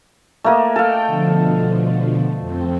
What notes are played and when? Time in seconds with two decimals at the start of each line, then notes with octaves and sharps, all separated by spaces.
0.44 A3 A#3 D#5
0.76 A4 F5 G5
1.06 B2 D3 F3
2.38 F2 C4